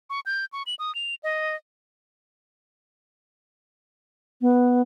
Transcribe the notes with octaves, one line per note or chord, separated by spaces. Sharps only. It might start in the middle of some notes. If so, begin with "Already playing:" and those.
C#6
G6
C#6
F#7
D#6
F7
D#5
B3